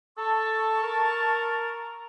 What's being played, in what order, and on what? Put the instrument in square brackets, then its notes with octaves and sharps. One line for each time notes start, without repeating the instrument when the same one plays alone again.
[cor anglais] A4 [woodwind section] A5 C#6
[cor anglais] A#4